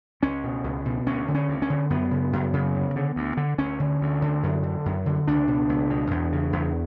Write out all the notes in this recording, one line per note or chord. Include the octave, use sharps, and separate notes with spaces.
C#2 C#4
B2
C#2
B2
D2 C#4
D3
C#4
D2
C#4
D3
F#2 B3
C#3
F#2
C#3
D2
D3
D2
D3
D2 C#4
D3
D2
D3
F#2
D3
F#2
D3
C#2 D4
B2
C#2
B2
E2
C#3
E2